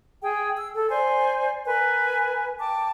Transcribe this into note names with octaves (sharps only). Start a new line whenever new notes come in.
G#4 G5
E6
A4
C5 D5 G#5
A#4 B4 G#5
G5 A5 D6